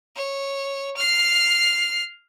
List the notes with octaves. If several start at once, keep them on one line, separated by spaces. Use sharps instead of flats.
C#5
F6 C7